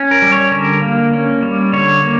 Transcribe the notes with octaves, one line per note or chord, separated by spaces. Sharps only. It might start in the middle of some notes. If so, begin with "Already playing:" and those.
Already playing: C#4
A#4
G3
C#5
D3 A#4
A#3
C#4
G3
D3 C#5
A#3